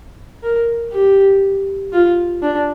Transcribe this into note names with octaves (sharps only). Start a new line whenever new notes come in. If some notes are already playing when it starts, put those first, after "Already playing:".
A#4
G4
F4
D4